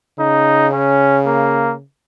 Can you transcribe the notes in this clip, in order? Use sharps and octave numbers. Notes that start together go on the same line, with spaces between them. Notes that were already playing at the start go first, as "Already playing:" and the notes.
C#3 D#4
C#4
A#3